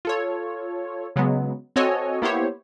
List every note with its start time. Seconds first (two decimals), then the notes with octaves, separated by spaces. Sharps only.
0.05 F4 A4 C#5
1.16 C#3 F#3 G#3 B3
1.76 C4 F#4 A4 C#5 D#5 G#5
2.22 A#3 B3 E4 G4 C5 C#5